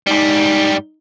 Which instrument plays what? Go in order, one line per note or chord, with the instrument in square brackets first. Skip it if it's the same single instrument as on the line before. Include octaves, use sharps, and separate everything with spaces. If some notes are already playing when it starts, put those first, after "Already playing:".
[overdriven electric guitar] G#2 G3 [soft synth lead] D#4